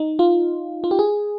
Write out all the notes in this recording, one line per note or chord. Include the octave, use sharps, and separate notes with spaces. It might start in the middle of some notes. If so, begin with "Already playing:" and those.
Already playing: D#4
F4
F4
G4
G#4